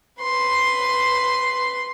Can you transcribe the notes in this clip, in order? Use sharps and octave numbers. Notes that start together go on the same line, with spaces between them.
B4 C6